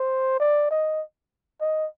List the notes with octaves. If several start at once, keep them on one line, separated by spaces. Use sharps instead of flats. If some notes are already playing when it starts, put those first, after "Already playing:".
Already playing: C5
D5
D#5
D#5